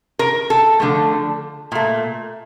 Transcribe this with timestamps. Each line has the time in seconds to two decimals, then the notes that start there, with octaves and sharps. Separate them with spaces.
0.19 A#4
0.50 A4
0.80 D3 F3 A3
1.72 A#2 A3